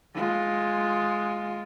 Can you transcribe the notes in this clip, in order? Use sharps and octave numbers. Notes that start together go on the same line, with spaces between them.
G#3 F4